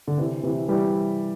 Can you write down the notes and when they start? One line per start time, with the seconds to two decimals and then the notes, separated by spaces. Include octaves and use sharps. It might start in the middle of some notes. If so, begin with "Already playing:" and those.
0.08 D3
0.18 C3 E3
0.43 C3 E3
0.68 E3 G3